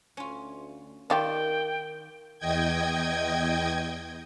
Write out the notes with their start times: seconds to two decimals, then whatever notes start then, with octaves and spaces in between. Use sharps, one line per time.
0.17 D2 C#4 F4
1.10 D#3 D4 F4 G4 A#4 D5 G5 A5
2.39 E2 D#5 G5 G#6